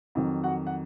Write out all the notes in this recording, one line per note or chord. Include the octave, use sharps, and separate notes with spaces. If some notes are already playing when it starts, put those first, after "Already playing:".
F2 D#3 F#3
F#4 F#5
F#5